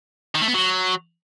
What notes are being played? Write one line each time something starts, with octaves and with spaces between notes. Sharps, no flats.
D#3
A3
B3
F#3